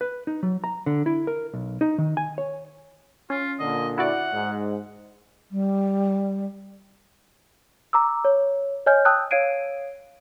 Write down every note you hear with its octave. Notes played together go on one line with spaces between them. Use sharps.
B4
D#4
F#3
A#5
D3
E4
A#4
B1
D#4
D#3
G#5
C#5
C#4 F4
A#2 D3 D#5
E4 F#4 D5 F#5
G#2
G3
A#5 D6 E6
C#5
C#5 D#5 G#5 F6 G6
G5 A5 D#6 E6 F#6 G6
C#5 F5 G#6 C7 D7 D#7